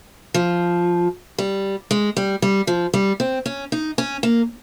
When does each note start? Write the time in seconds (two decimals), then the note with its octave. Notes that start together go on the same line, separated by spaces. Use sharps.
0.34 F3
1.38 G3
1.91 G#3
2.17 G3
2.42 G3
2.67 F3
2.94 G3
3.20 C4
3.46 C#4
3.72 D#4
3.98 C#4
4.23 A#3